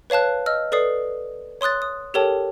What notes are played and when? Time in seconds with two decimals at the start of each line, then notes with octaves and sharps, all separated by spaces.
0.10 B4 C#5 F5 A5 F#6
0.46 D#5 E6 F6
0.72 A4 B4 D5 D#6 C7
1.61 C#5 C6 D#6 F#6 A6
1.82 D#6
2.14 G4 A4 A#4 C#5 G5 A5